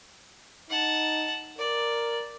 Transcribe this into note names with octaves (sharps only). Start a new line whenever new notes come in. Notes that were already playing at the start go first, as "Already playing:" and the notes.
D#4 F#5 A5
A#4 D5